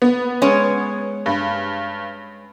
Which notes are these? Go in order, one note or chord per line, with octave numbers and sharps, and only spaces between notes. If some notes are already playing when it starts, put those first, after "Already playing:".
B3
G#3 C#4 C#5
G2